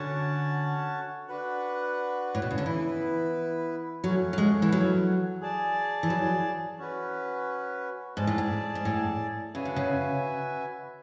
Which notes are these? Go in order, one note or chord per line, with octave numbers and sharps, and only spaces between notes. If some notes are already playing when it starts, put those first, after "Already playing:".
Already playing: D3 C#4 F#4 C#5 F#5 A5
D4 F#4 B4 F#5
A2
B2
C#3
D3
E3 B3 E4 B4
F#3 A3 C#4 F#4
F#3
G#3
E3
F#3
G#4 D5 A5
E3
F#3
C#4 F#4 B4
G#2 G#4 D5 A5
A2
G#2
G#2
A2
C#3 F#4 B4 E5 G#5
D3
C#3